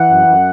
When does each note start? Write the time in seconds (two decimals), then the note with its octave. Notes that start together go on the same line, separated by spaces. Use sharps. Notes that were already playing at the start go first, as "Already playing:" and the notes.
Already playing: E3 F#5
0.09 F#2
0.27 F#2